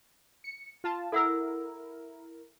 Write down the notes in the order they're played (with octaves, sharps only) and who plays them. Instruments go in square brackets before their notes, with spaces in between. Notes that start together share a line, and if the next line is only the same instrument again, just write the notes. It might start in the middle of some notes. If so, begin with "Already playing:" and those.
[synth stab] C#7
F4 A5
[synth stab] E4 A#4 [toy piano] A4 F#5 E6